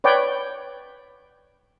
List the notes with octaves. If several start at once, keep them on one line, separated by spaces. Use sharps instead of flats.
B4 C#5 D5 G5